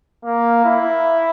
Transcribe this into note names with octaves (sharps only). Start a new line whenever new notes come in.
A#3
E4